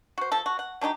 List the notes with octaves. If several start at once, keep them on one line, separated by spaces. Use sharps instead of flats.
F#4 C5
F3 A4
F#4
F#5
F#3 D4 D#4 G4